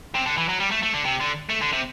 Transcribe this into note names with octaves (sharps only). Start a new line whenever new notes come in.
C3
D3
E3
F#3
G3
A3
A3
D3
C3
D3
A3
D3
C3